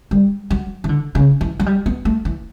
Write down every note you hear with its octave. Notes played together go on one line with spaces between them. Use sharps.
G3
F#3
E3
D3
C#3
E3
F#3
G3
B3
A3
E3